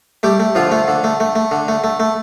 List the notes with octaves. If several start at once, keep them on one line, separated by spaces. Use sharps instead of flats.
G3 A3 G4
A3
D3 F3 F4
A3
D3
A3
A3
A3
D3
A3
A3
A3